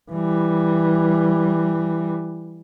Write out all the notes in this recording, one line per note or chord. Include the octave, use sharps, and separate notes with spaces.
E3 G3